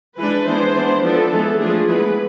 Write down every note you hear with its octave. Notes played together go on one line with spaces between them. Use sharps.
E3 G#3 D4 B4
E3 G#3 B3 D4 C5
E3 B3 D4
F3 B3 D4 A4
E3 G#3 B3
F3 A3 D4 G#4
E3 G#3 B3 B4